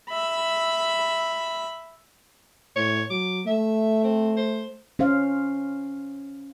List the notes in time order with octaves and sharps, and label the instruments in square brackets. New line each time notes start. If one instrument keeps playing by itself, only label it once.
[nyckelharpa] E5 B5
[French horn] A2 [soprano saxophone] C#5
[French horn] F#3 [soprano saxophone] D6
[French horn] A3 [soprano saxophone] E5
[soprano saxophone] C4
C5
[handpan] C#4 C5 F5